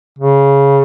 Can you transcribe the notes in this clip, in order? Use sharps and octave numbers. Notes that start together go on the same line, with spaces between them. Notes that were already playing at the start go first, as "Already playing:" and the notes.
C#3